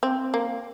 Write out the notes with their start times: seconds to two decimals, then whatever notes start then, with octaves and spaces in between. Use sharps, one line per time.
0.03 C4
0.34 A#3